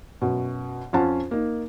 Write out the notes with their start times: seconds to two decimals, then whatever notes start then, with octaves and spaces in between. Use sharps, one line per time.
0.22 F#2 B2
0.93 F2 C#4 F4 F#5 A5
1.31 A#3 D#4